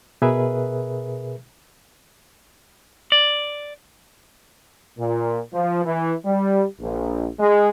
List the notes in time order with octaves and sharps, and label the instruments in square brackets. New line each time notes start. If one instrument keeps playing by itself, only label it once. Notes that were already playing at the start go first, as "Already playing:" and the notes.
[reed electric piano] B2 G#4 A#4 B4 E5
[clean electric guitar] D5
[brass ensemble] A#2
F3
E3
G3
A#1
G#3